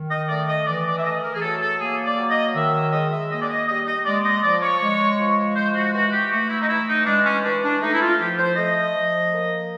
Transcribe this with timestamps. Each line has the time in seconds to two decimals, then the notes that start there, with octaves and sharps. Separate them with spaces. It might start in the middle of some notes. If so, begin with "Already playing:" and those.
Already playing: D#3
0.11 D#5
0.29 A3 D5
0.48 D#5
0.67 E3 D5
0.86 D5
0.98 E5
1.04 A3 D#5
1.23 A#4
1.35 G#4
1.42 F#3 A4
1.61 A4
1.79 A#3 G#4
2.05 D5
2.17 F#3
2.31 D#5
2.55 D#3 E5
2.74 E5
2.93 G#3 D#5
3.12 E5
3.31 A#3 D#5
3.42 D5
3.50 D#5
3.67 G3 D#5
3.86 D#5
4.05 G#3 D5
4.24 D#5
4.43 F3 D5
4.62 C#5
4.81 G#3
5.19 F3
5.56 G#3 C5
5.75 F#4
5.93 E3 F#4
6.12 G4
6.31 A3 F#4
6.50 E4
6.61 D#4
6.68 E3 E4
6.88 D#4
7.06 G#3 D4
7.26 C#4
7.44 E3 D4
7.63 D4
7.82 A3 D#4
7.94 E4
8.01 F4
8.19 F3 G4
8.38 C5
8.57 A3 D#5
8.95 F3
9.33 A#3